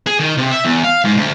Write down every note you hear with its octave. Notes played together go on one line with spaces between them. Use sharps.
G#4
D#3
C3
E5
E2
F5
G#2
D2